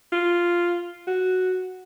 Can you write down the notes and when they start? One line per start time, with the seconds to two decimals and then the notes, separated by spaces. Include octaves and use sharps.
0.12 F4
1.07 F#4